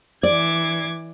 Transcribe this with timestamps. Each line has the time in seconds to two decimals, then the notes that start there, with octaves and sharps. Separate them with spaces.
0.23 E3 D5 D6 G#6